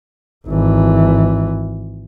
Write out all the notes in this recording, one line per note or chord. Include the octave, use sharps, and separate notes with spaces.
G#1 E3